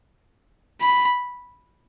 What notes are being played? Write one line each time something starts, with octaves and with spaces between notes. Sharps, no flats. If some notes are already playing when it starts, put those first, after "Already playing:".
B5